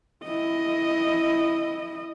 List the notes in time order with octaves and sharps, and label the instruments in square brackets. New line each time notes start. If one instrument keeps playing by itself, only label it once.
[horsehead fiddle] E4 D#5